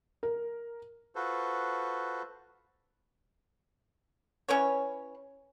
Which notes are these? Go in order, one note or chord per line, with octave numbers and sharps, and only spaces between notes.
A#4
F4 F#4 A4 B4 C5
C#4 E4 B4 C#5